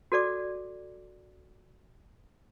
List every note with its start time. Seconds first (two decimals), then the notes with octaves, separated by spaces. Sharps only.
0.12 F#4 A4 D5 D6